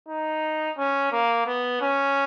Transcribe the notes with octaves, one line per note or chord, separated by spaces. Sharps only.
D#4
C#4
A#3
B3
C#4